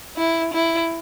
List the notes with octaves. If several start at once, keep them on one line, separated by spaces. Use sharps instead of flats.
E4
E4